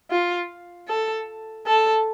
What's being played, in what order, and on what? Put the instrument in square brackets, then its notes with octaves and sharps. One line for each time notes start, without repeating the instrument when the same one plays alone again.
[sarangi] F4
A4
A4